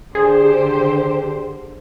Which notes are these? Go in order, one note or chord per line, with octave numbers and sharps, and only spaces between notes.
D3 G4 G#4 C5